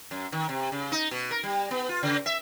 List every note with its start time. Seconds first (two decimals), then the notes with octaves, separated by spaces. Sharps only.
0.11 F#2
0.32 D#3
0.49 C3
0.72 C#3
0.92 D#4
1.11 B2
1.31 A#4
1.43 G3
1.71 B3
1.89 F4
2.03 C#3
2.26 E5